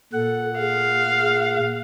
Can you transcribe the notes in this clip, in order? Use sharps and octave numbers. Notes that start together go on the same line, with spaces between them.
A#2 A4 F#5
G#4 F5
G#4